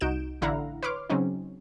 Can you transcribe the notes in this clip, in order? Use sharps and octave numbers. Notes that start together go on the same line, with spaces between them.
C2 D#4 F#4 G6 D7 E7
A1 D3 E4 F5 F#5 A#5
B4 C#5 C6 D6 F6
C#3 F#3 C4 C#4 D#4